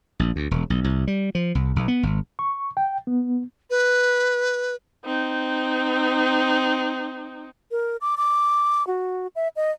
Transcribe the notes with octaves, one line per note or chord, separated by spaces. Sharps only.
A#1
D2
E1
B1
C2
G3
F3
C2
B1
B3
G#1
C#6
G5
B3
B4
C4 D#4
A#4
D6
D6
F#4
E5
D#5